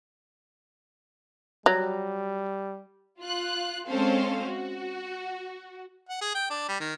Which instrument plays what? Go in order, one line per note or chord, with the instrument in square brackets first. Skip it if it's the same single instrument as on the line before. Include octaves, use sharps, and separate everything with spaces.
[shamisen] F#3 [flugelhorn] G3
[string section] F4 F#6
G#3 C4 C#4 A4 C5 F5
F#4
[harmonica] F#5
G#4
G5
D4
G3
D#3